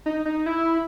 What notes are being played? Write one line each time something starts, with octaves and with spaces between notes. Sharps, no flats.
D#4
D#4
E4